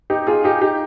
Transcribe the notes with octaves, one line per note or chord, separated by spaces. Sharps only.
D#4 G4
F4 G#4
D#4 G4
D#4 G4